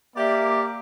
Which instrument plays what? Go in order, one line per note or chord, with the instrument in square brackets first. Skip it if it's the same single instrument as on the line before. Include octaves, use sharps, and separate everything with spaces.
[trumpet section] A#3 [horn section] G4 D5 [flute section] E5